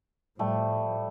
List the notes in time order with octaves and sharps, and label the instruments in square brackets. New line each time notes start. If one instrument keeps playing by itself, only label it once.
[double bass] A2 F3 [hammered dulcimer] G3 A3